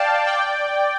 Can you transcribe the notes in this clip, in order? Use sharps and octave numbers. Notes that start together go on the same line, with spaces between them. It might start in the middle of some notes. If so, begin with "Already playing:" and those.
Already playing: D5 F5 G5 A5
D5 G5